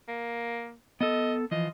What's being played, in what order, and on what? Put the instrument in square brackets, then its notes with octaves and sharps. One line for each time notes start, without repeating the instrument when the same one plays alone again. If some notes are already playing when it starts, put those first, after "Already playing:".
[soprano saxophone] A#3
[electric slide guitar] B3 A4 [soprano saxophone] D#5
[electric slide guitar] E3 F3 [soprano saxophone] D#5